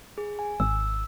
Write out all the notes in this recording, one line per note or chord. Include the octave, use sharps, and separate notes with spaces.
G#4
G#5
G#1 E6